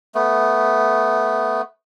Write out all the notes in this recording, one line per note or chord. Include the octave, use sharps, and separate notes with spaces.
A3 B3